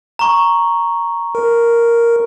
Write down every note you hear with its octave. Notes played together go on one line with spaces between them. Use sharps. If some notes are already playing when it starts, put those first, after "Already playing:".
A#5 C#6
A#4